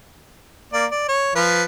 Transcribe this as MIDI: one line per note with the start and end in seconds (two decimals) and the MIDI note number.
0.73 0.86 58
0.73 0.86 74
0.91 1.07 74
1.08 1.31 73
1.35 1.63 53
1.35 1.63 71